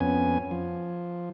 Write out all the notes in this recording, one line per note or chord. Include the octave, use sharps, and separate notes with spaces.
F2 B3 C#4 G#5
F3